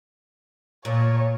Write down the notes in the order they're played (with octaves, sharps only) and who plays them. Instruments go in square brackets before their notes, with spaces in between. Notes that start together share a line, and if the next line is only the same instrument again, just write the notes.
[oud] A#2 [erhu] C#5